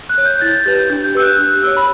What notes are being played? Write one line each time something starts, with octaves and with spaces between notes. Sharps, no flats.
F#6
C#5
G6
G6
E4 A6
G4 B4 G6
D4 G6
G6
G4 B4 E6
F#6
D4 F#6
G4 C#5 E6
B5